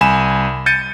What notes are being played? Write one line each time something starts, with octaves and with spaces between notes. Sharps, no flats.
C2 G#5 B5 E7
G6 A6 C#7 D#7